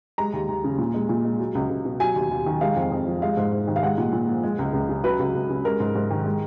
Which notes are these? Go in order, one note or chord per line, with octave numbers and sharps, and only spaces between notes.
G#3 A#5
D#2
D#2
C#3
A#2
G#3
A#2
G#3
F#3
C#2
C#2
B2
F#3 G#5
D#2
D#2
D#3
G#3 F5
F2
F2
F3
G#3 F5
G#2
G#2
D#3
F5
G#3 F#5
A#2
A#2
F3
G#3
C#2
C#2
C#3
F#3 B4
C#2
C#2
C#3
G#3 A#4
G#2
G#2
D#3
G#3